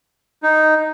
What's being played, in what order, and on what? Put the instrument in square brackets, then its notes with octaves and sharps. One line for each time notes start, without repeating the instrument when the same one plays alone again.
[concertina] D#4